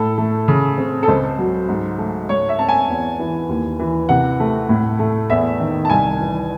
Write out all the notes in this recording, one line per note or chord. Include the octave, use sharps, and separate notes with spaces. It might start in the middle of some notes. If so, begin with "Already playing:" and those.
Already playing: A2 A4
A3
C#3
C4
A4
C#2 C5
F#3
G#2
A3
G#2 C#5
E5
C4 A5
G#5
E2
E3
D#2
E3
C3 F#5
A3
A2
A3
E2 E5
D#3
A5
C2 G#5
E3